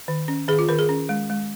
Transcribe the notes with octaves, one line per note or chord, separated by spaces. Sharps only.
D#3
C#4
D#3 G#4
F4
D#3 A#4
G#4
C#4
G#3
G#3